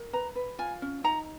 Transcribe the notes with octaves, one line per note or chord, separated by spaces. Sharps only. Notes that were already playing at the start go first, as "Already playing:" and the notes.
Already playing: A#4
B4 A#5
B4
F4 G#5
C#4
D#4 A#5